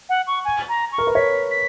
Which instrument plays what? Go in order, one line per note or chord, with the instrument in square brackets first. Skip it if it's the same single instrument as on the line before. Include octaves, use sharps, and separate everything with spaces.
[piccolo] F#5
C#6
G#5
A#5
C#6
[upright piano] A#4
B4
[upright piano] C#5 [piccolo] B6
[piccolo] B6